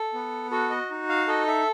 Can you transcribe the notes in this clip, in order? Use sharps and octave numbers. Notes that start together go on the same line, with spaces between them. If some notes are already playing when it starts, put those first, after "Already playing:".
Already playing: A4
B3
F#4 A4
D#5
D#4
F5
A4 D#5
E5